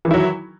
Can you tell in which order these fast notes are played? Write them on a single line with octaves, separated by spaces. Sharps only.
E3 D#3 E4 F#3